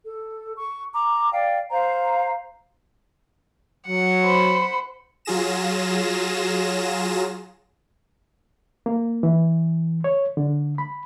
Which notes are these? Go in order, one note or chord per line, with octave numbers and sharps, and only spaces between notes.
A4
C#6
A#5 D6
D5 F5 G5
C5 F5 A#5
F#3 F#5
C5 B5
F#3 F4 G#4 A#6 E7
A#3
E3
C#5
D3
B5